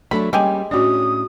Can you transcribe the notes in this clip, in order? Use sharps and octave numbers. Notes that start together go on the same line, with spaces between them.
F#3 A3 D4 B5
G3 G#3 A#3 C#4 G4 G#4
A2 C#4 D4 F#4 D5 D#6